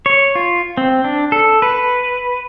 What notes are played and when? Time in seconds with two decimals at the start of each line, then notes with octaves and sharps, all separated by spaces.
0.06 C#5
0.35 F4
0.77 C4
1.04 D4
1.32 A4
1.62 B4